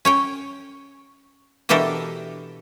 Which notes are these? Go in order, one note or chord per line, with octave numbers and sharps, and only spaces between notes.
C#4 C#5 G5
B2 E3 D4 G4 A4 A#4